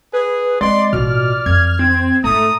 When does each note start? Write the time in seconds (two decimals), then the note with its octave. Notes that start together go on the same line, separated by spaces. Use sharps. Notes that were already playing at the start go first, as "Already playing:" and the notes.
0.13 G#4 B4
0.61 G#3 C4 D5 C6
0.93 A1 B2 F4 D5 F6
1.46 F2 E3 G#6
1.79 C4
2.24 G#2 A3 A#5 D#6